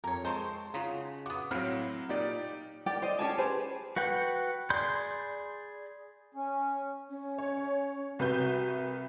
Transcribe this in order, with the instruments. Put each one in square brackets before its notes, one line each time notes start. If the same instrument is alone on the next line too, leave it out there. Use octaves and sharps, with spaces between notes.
[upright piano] F2 [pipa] A#4 C#5
[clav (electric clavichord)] G#3 [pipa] C4 A#4 C5 [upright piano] A5 C6 C#6
[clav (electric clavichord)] C#3 [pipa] D#4 F4 F#4
[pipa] B3 F#4 [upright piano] D6 D#6
[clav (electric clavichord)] A2 F5 [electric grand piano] F#3 C4 [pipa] F#4 B5 [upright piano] F6
[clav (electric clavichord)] A#2 [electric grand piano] D#4 G4 D5
[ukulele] G4 A#4 D5 G5
C5 D5 D#5
C#4 G4 G#4 A5
G4 G#4 B4 C5
[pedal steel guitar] F#4 B4 F#5 G5
G#4 D5 B5 C6 G6
[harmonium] C#4
[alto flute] C#4
[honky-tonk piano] C#5
[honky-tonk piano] C2 B4 G6 [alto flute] F#4